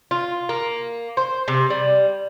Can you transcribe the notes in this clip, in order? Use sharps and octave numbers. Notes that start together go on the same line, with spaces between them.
F4
A#3
C5
C3
G3